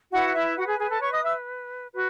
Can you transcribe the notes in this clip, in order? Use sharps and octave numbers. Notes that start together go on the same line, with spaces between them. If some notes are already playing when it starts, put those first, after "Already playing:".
E4 F#4 B4 F#5
E4 E5
F#4 F#5
G#4 G#5
G#4 G#5
A4 A5
C#5 C#6
D#5 D#6
E5 E6
F#4 B4